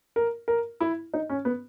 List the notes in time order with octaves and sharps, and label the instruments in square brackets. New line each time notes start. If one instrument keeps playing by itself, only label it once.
[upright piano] A#4
A#4
E4
D#4
C#4
B3